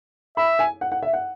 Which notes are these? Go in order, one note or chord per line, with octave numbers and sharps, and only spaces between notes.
E5 B5
G#5
F#5
F#5
E5
F#5